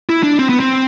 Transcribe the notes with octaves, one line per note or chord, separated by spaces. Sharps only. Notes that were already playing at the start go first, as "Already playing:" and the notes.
E4
D4
C4
B3
C4